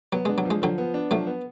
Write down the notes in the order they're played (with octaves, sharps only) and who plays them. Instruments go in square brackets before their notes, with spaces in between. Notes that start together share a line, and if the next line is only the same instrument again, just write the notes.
[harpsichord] F#3 [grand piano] B3
[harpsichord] G#3 [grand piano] D4
[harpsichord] F#3
[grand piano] F3
[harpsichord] G#3
[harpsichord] D3 F#3 [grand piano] F3
[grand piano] B3
D4
[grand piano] F3 [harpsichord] F#3 A3
[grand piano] B3